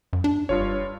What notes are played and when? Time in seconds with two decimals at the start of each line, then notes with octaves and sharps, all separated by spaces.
0.13 F#2
0.24 D4
0.49 F#1 G2 F4 C#5